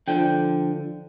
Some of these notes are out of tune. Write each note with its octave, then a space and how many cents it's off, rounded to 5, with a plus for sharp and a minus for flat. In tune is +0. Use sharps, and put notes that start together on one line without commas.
D3 +0 F3 +0 G5 +0